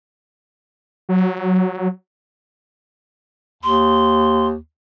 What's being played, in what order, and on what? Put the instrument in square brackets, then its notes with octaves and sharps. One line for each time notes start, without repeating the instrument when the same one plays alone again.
[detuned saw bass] F#3
[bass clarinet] D#2 [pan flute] C6